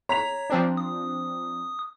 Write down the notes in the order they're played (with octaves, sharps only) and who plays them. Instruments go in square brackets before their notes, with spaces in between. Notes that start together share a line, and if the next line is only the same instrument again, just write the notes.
[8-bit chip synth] C#5 [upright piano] A#5 B6 F7
[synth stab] F3 C4 D4
[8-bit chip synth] D#6